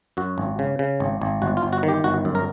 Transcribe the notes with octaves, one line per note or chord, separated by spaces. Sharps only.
F#2 F#4
G#1
C#3
C#3
G#1
G#1
G1 F#4
F4
G1
F#4
D#3
G4
G1 F#4
F#2
A#4